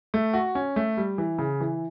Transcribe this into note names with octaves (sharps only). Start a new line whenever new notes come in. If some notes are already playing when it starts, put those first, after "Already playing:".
A3
F#4
C#4
A3
G3
E3
C#3
E3